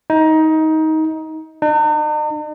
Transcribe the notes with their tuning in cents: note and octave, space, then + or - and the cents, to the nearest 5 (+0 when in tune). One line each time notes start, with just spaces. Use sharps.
D#4 +20
D#4 -45